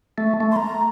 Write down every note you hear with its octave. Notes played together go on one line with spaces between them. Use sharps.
A3
A3
C6
A#5